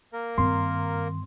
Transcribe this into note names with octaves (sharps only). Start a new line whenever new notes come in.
A#3 A#4
G2 D#3 C4 C6